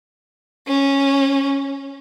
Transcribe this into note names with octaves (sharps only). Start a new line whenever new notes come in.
C#4